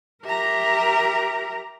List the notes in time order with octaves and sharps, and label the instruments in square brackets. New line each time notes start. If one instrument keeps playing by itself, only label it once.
[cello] G4 A#4 [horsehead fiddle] E5 A#5